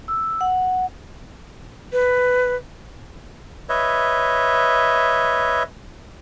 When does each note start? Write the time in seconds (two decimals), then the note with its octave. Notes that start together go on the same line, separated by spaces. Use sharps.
0.08 E6
0.41 F#5
1.93 B4
3.69 B4 C#5 D#5 E5